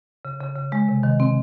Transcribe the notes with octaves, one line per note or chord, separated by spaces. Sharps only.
C#3
C#3
C#3
G#3
C3
D#3
C4